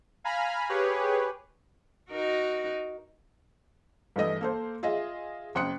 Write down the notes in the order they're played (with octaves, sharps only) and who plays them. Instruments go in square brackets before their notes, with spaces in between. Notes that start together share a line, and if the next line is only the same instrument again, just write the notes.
[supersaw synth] F5 G#5 A#5 B5 F6
G4 G#4 B4 C#5
[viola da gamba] D#4 F#4 A#4
[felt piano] G2 E3 A3 D#5 D#6
A#3 A4 C5
F4 G#4 D#5 E5
F#1 G5 C6 D#6 F#6 C#7